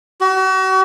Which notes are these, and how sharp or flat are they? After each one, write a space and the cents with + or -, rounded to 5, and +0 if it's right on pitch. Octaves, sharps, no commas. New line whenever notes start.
F#4 +40